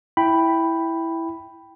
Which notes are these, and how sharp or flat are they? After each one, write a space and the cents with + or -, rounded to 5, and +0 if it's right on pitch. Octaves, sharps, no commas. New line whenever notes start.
E4 +0 G5 +0 B5 +0